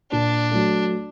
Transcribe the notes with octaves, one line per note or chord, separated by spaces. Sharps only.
A#2 D4
F#3 A3